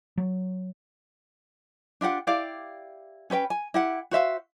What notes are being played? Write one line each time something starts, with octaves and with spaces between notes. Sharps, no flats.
F#3
D4 F4 G4 F#5
E4 G4 D5 F5
C#4 G4 B4 G5
G#5
E4 G4 F#5
F#4 C5 E5 F5